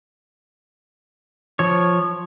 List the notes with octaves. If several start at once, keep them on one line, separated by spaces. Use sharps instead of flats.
F3 C#5